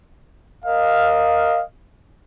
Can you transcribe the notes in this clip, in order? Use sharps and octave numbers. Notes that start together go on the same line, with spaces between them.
A#4 D#5 F5